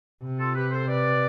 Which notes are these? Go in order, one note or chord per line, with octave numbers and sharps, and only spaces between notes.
C3
F4 A4
G4 B4
A4 C5
B4 D5